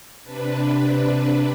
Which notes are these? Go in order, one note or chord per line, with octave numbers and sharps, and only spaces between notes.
C3 D4 B4